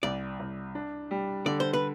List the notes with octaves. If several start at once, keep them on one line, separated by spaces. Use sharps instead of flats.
C2 D5
C2
D4
G3
D3 D5
C5
B4